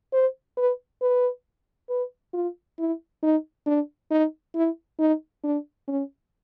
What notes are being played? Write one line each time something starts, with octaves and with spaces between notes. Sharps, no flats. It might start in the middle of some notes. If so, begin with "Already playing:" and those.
C5
B4
B4
B4
F4
E4
D#4
D4
D#4
E4
D#4
D4
C#4